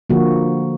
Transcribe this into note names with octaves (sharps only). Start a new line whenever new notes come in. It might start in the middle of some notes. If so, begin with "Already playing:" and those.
D3 F3 A#3 F#4